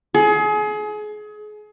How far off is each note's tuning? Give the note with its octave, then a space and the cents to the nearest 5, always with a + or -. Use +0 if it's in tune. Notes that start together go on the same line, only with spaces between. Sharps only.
G#4 +30